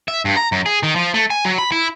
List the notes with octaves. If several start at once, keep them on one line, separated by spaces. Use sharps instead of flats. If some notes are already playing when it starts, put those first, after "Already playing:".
E5
G2
A#5
F#2
G#4
D#3
F3
A3
G#5
F#3
B5
E4